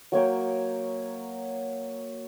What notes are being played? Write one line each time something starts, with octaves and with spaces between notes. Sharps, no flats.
F#3 A#3 C#5 G5